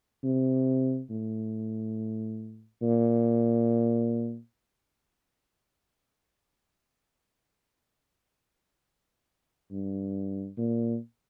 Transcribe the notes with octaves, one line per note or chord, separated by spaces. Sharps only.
C3
A2
A#2
G2
A#2